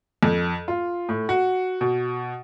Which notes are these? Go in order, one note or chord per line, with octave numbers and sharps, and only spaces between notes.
F2
F4
A2
F#4
B2